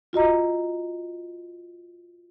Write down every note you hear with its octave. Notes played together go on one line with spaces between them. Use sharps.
F4 F#4 D#5 A#5